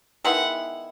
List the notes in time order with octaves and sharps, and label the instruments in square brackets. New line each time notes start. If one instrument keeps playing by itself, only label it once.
[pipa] D#3 G#3 B3 E4 [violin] F#5